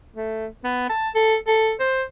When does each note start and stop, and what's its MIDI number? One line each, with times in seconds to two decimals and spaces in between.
0.16 0.46 57
0.64 0.85 59
0.90 1.10 81
1.15 1.36 69
1.47 1.73 69
1.80 2.03 72